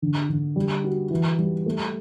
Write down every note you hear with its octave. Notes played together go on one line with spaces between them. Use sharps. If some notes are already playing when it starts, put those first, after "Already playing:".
D3
D3
G3
F#4
E3
G3
A3